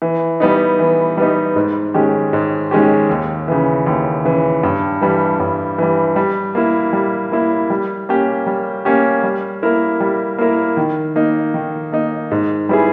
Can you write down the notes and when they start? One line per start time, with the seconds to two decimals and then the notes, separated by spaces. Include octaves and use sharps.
0.02 E3
0.40 G3 B3 D#4
0.79 E3
1.17 G3 B3 D#4
1.56 G#2
1.94 D#3 G#3 C#4 G4
2.33 G#2
2.71 D#3 G#3 C#4 G4
3.10 D#2
3.48 C#3 E3
3.86 D#2
4.25 C#3 E3
4.63 G2
5.01 E3 G3
5.40 G2
5.78 E3 G3
6.16 G3
6.55 A#3 E4
6.93 G3
7.32 A#3 E4
7.70 G3
8.09 A#3 C#4 G4
8.47 G3
8.85 A#3 C#4 G4
9.23 G3
9.63 A#3 E4 A#4
10.00 G3
10.38 A#3 E4 A#4
10.77 D#3
11.16 A#3 D#4
11.54 D#3
11.92 A#3 D#4
12.31 G#2
12.69 G3 B3 E4 G#4